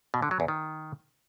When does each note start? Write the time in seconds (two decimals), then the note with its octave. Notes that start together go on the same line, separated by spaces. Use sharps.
0.14 B2
0.22 D3
0.31 F#3
0.40 E2
0.48 D#3